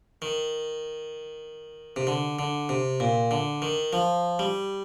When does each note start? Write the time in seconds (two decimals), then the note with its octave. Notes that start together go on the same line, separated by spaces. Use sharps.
0.22 D#3
1.96 C3
2.07 D3
2.39 D3
2.69 C3
3.00 A#2
3.31 D3
3.62 D#3
3.93 F3
4.39 G3